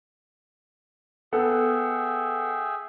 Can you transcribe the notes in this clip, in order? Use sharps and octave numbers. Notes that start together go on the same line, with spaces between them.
B3 G#4 A4 E5 F#5 G5